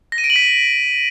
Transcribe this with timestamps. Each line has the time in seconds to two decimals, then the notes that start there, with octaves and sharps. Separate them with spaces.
0.12 A#6
0.18 D#7
0.24 D7
0.30 F#7
0.36 B6